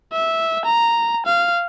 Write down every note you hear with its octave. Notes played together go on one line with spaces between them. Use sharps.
E5
A#5
F5